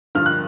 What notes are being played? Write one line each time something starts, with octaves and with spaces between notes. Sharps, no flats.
G2 D3 F3 F6
F#6